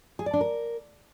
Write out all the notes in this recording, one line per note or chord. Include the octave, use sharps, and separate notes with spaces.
G#4
D5
D4
A#4